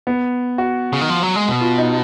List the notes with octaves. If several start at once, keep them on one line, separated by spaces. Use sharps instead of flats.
B3
F#4
C#3
D#3
F3
F#3
G#3
B2
F4
D#4